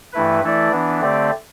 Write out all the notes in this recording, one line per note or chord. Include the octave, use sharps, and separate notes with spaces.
G2 E3 A3 E4 B4
E3 A3 E4 A4 D5
E3 B3 D4
D3 A3 C4 G4 D5